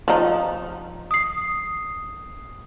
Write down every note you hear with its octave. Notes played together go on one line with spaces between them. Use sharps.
F3 D#4
D#6 C7